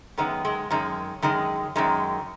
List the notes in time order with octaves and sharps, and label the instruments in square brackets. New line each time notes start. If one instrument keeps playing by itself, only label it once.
[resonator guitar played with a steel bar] F#2 D#3 G#3 B3
G#3
F#2 D#3 G#3
F#2 D#3 G#3
F#2 D#3 G#3